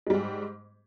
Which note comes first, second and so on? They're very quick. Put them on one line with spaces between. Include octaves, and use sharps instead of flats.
G#3 G3 G#2